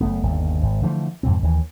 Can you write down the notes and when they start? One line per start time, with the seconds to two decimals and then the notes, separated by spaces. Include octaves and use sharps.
0.01 F#1 A3 B3
0.23 G1 D#2
0.63 G#1
0.82 D3 E3 F3 A3
1.23 F2 G#2 B2 C4
1.42 D#2 E3